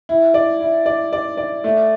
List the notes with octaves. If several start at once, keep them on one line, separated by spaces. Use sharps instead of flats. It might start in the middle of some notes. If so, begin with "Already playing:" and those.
E4
D5
E4
D5
D5
D5
A3